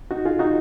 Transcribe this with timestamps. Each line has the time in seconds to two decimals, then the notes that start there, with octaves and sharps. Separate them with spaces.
0.11 D#4 F#4
0.25 F4 G#4
0.39 D#4 F#4